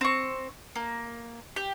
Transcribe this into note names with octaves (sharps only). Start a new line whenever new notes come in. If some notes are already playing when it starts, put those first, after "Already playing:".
C4 C#6
A#3
G4